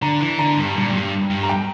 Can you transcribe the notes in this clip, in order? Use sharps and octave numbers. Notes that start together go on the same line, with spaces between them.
D3 A#5
E3
D3 A#5
G2
A#2
F#2
G2
G2
A#5
G5